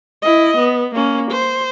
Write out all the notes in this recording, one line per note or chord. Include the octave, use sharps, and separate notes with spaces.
E4 D#5
B3
A#3 C#4
C5